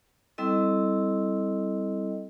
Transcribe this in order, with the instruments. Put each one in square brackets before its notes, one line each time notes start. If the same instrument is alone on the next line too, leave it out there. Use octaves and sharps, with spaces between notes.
[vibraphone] G3 C4 E4 A4 D#5